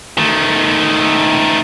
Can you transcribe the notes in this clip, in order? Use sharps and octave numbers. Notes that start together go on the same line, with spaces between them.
D#3 A3